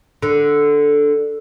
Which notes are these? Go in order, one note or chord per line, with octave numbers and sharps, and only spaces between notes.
D3